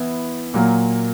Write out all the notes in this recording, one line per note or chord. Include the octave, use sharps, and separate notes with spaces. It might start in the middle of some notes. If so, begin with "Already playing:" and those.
Already playing: E3 B3 E4
A#2 F#3 A#3